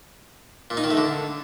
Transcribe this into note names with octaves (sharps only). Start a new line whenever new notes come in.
A#2
D#4
D#3
A3
D3